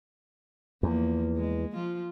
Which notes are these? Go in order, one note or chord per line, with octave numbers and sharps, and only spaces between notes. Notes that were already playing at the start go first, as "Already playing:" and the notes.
E2 F3 A#3
G#3
F3 F4